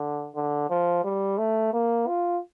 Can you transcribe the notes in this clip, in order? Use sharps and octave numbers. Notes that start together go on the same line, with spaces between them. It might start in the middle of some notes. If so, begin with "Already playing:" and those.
Already playing: D3
D3
F3
G3
A3
A#3
F4